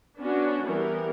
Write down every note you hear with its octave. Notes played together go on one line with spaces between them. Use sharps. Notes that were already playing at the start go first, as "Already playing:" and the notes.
B3 C#4 D4 F#4
E3 G3 B3 A#4